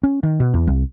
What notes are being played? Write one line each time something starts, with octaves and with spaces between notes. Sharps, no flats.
C#4
D#3
B2
E2
C2